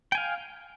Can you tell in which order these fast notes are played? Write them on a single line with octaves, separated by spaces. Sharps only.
G5 G#5 F5